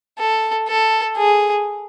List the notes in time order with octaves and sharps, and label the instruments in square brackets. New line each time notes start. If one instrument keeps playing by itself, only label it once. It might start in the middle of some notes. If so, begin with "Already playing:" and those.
[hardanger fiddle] A4
A4
G#4